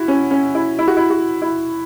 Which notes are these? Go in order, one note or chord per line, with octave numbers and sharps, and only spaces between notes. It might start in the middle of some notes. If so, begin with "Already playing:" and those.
Already playing: E4 F#4
C#4
C#4
E4
E4
F#4
E4
F#4
E4